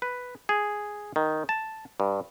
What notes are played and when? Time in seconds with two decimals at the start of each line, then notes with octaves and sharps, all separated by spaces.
0.02 B4
0.49 G#4
1.16 D#3
1.49 A5
2.00 G2